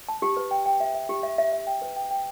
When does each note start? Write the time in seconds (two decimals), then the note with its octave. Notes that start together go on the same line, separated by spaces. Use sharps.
0.09 A5
0.22 G4
0.37 B4
0.51 G5
0.66 G5
0.80 E5
0.95 E5
1.09 G4
1.23 E5
1.38 E5
1.52 E5
1.67 G5
1.82 B4
1.96 G5
2.11 G5